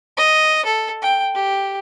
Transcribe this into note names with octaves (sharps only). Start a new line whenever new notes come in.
D#5
A4
G5
G4